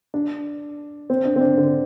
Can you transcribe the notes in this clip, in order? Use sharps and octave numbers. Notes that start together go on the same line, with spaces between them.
D4
C4
D4
C4
D4
D3